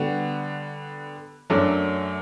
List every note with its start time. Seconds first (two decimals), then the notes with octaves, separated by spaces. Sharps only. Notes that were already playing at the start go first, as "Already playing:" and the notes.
Already playing: D3 G3 B3 F#4
1.50 F#2 F#3 A3 D4